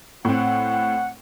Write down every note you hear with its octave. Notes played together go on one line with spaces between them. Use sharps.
A2 C4 F#5